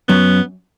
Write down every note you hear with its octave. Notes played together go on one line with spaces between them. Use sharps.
F#2 B3